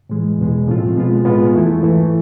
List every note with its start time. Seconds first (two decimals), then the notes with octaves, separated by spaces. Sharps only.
0.09 A2 E3 G#3
0.38 E2 B2 G#3
0.68 A2 F3 A3 C4 F4
0.96 B2 G#3 B3 F4
1.25 A2 G#3 B3 F4
1.53 F2 E3 A3 E4
1.82 G#2 E3 A3